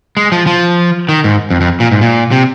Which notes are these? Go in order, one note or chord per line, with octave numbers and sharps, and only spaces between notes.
G#3
F3
F3
D#3
G#2
F2
F2
A#2
G#2
A#2
C3